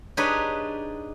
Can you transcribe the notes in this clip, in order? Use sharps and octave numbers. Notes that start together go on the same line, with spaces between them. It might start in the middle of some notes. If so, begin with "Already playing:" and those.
D4 D#4 G4 G#4 B4 C#5